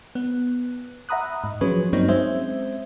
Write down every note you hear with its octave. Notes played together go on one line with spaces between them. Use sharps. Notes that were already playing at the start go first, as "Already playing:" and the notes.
B3
E5 F#5 A#5 B5 D#6 F#6
G#2
F3 F#3 G#3 C#4 G#4 B4
G2 F#3 A#3 C4 D#4
G#3 C4 C#4 C5 E5